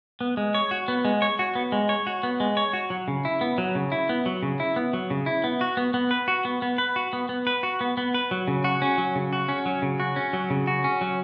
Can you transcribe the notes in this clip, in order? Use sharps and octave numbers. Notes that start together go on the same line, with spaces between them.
B3
G#3
C#5
F#4
B3
G#3
C#5
F#4
B3
G#3
C#5
F#4
B3
G#3
C#5
F#4
F#3
C#3
E4
B3
F#3
C#3
E4
B3
F#3
C#3
E4
B3
F#3
C#3
E4
B3
F#4
B3
B3
B4
F#4
B3
B3
B4
F#4
B3
B3
B4
F#4
B3
B3
B4
F#3
C#3
F#4
C#4
F#3
C#3
F#4
C#4
F#3
C#3
F#4
C#4
F#3
C#3
F#4
C#4
F#3